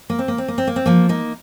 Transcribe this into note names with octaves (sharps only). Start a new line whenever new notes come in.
A#3
C4
A#3
C4
A#3
C4
A#3
C4
F3 A#3
A#3 D#4